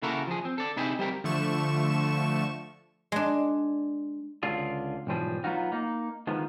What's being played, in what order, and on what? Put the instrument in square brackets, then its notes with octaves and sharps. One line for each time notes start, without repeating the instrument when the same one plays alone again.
[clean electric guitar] C#3 A#3 E4 F#4 A4 A#4
F3 G#4
C4
A4 D5
C3 D#4 E4 G4 G#4
G3 C4 G4 A#4
[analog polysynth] D3 F3 A3 C#6 E7
[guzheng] G#3 D4
[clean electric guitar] C#2 D3 D4 F4 G#4
B1 G#2 E3 F3 G3 G#4
F#3 B3 C4 D#4 F4 F#4
A#3 D#4
D#3 F3 G#3 B3